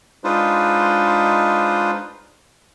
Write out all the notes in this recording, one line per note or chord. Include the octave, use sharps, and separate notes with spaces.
G#3 D4 D#4 F4 B4 C5